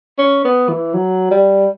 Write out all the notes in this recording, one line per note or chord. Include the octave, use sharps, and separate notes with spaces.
C#4
B3
E3
F#3
G3